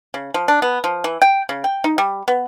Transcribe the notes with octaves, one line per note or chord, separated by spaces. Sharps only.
C#3
F3
D4
B3
F3
E3
G5
C#3
G5
D#4
G3
B3